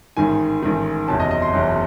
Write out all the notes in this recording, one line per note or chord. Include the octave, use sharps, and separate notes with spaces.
A1 G#2 D#3 G#5
A1 G#2 D#3
F#1 E2 C3 F#3 A5
D#5
D#5
C6
F#1 E2 C3 F#3